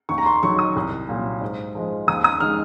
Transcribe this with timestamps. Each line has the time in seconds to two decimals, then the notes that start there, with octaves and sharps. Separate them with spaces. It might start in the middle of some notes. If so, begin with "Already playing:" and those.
0.09 D#2 C#6
0.18 A#5
0.26 C6
0.43 D#3 F#3 C#6
0.59 D#6
0.76 C2
1.09 A#2 F#3
1.41 G#2
1.75 F3 G#3
2.07 D#2 D#6
2.24 D#6
2.40 D#3 G#3 F6